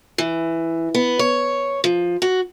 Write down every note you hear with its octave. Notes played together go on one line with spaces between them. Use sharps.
E3
B3
C#5
F3
F#4